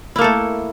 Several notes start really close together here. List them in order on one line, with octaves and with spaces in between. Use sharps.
E4 A#3 A4 A3